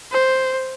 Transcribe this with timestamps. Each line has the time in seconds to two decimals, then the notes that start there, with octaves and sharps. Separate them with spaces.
0.12 C5